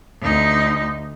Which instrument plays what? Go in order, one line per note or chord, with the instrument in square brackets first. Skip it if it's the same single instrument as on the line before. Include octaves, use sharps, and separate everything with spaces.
[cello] D2 D#4